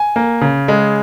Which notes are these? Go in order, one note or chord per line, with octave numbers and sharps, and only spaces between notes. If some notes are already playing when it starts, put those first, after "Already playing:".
Already playing: G#5
A#3
C#3
G#3